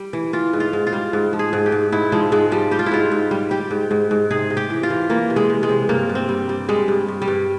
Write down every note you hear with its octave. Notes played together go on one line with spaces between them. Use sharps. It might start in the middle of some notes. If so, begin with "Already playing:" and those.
Already playing: G3
E3
E3 F4
G#2
F4
G#2
F4
G3
G#2
F3
G#4
G#2
G4
G#2
G#2 E4
F3 G#3
G#2 G#3
F3 G3
G3 G4
F4
E4
G#2 F4
G#2
G3
G3 G4
G#2
G#2
G#2
C3 G#4
C3
G4
E3
F4
E3
E3 A#3
C3
G#3
C3
G#3
C3
G2 A#3
G2
C4
G3
G3
G3 G#3
G2
G2
G3
G2